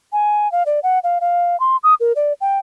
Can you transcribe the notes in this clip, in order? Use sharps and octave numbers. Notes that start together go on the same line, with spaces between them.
G#5
F5
D5
F#5
F5
F5
C6
D#6
A#4
D5
G5